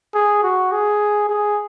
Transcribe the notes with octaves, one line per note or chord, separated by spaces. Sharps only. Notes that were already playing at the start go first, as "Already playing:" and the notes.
G#4
F#4
G#4
G#4